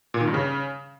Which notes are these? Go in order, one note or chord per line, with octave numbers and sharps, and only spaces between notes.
A#2
D#3
G2
C#3